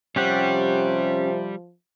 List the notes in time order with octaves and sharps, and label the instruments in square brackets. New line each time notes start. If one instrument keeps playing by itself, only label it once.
[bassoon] C3 [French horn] F3 [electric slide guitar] G3 [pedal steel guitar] C#4 G4 F#5